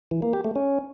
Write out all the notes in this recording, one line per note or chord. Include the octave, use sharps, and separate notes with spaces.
E3
A#3
G4
A3
C#4